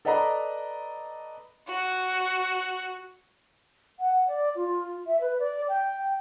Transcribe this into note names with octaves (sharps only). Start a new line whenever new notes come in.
A4 B4 D5 D#5 A#5 B5
F#4
F#5
D5
F4
E5
B4
D5
G5